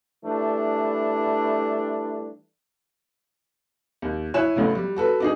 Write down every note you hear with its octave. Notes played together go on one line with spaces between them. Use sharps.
E3 G3 A3 D4
D#2
E4 C#5 G#5 F#6 E7
A1 A2 C#3
G3
F#4 A4 B4
D4 D#4 G#4